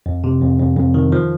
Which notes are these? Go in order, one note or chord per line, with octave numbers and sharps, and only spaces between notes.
F2
C3
F2
F2
F2
D#3
F3